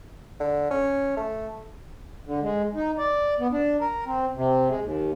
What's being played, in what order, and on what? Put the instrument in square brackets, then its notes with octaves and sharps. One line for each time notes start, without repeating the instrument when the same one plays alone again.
[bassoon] D3
C#4
A3
[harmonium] D3
G#3
D#4
D5
B3
D4
A#4
C4
C3
G#3
D#2